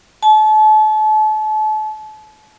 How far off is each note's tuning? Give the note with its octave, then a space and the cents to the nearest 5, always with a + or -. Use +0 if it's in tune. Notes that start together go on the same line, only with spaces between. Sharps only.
A5 -35